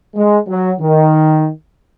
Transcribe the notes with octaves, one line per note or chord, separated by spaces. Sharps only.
G#3
F#3
D#3